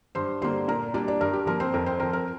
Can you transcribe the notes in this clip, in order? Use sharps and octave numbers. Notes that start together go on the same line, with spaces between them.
G2 C5 C6
D3 G3 A#3 C5 C6
A#2 A#4 A#5
G3 A#3 D4 D5
D4 D5
G2 A#4
G4
F3 A#3 A#4
C4 C5
F2 A#4
C4 C5
F3 C4 A#4
A#4